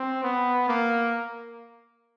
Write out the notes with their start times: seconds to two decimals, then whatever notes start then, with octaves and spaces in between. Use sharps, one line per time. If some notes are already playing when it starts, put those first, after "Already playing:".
Already playing: C4
0.23 B3
0.68 A#3